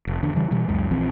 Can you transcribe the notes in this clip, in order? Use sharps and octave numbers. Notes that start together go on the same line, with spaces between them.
F1
E2 D3
C#3 E3 G3
B2 E3 G3
C#2 F#2 G#3
A#1 E3 F3 C4